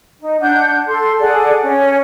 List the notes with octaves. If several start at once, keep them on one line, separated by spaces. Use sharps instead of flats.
D#4
D4 F#5 G6
A4 C6
G#4 A4 D5 F#5
C#4